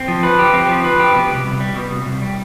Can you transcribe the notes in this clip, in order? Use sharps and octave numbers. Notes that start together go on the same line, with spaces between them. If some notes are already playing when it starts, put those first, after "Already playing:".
Already playing: C4
F3
B4
G4
C4
F3
B4
G4
B2
C2
C2
G3
B2
C2
C2
G3